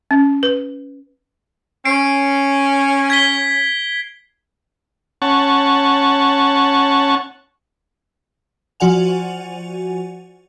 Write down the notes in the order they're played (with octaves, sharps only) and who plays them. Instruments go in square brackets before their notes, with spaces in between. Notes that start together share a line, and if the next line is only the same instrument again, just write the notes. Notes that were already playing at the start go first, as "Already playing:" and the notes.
[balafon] C#4
B4
[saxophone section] C#4 [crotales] C7 D7
[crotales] G#6 B6 G7
[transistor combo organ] C#4 F#5 A5 C#6
[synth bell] F3 F#4 D5 F#5 G#5 F7